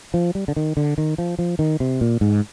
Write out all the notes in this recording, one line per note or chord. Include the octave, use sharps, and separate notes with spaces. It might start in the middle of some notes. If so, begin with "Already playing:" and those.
F3
G3
D3
D#3
D3
D#3
F3
F3
D#3
C3
A#2
G#2